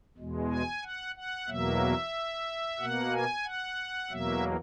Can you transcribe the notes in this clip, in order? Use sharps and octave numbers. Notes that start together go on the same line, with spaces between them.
E2 B2 G#3
G#5
F#5
F#5
E2 B2 F#3 A#3 E5
B2 A#3 F#5
G#5
F#5
E2 B2 F#3 A#3 E5